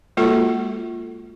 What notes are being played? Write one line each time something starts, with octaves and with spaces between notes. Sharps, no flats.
G#3 A#3 F4 F#4 A4